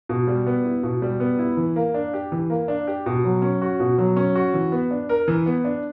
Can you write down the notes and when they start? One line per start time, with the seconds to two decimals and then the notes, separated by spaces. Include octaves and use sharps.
0.09 B2
0.27 G3
0.47 B3
0.65 E4
0.83 B2
1.02 G3
1.20 B3
1.39 E4
1.57 E3
1.76 A#3
1.94 D4
2.14 G4
2.32 E3
2.50 A#3
2.68 D4
2.87 G4
3.06 B2
3.24 F#3
3.42 C#4
3.62 F#4
3.80 B2
3.98 F#3
4.16 C#4
4.35 F#4
4.54 E3
4.72 B3
4.91 D4
5.09 A#4
5.28 E3
5.46 B3
5.65 D4